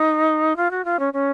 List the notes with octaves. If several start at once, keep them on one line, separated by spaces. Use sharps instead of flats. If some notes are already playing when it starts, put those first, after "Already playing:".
Already playing: D#4
F4
F#4
F4
C#4
C#4